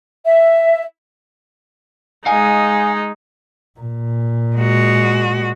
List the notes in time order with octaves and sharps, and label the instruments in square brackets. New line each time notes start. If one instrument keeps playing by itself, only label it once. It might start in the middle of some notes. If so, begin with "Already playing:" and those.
[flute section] E5
[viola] G#3 D#4 [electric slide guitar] F5 G#5
[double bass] A#2
[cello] G#3 F#4